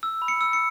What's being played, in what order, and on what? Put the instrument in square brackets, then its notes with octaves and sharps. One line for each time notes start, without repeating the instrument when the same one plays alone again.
[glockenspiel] E6
B5
C#7
E6
C#7